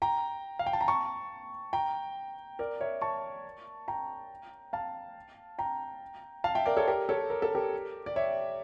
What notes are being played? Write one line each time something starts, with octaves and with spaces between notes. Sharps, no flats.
G5 A#5
F5
G5
A5
A#5
A5 C#6
G5 A#5
A#4 D5
C#5 E5
A5 C#6
G5 A#5
F5 A5
G5 A#5
F5 A5
E5 G5
A#4 D5
A4 C#5
G4 A#4
A4 C#5
A#4
A4
G4 A#4
D5
C#5 E5